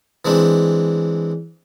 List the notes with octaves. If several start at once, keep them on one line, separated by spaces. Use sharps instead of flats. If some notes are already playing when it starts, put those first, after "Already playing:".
E3 G#3 C4 D4